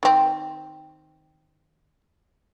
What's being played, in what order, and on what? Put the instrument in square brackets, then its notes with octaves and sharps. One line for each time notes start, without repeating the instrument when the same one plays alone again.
[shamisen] D#3 C4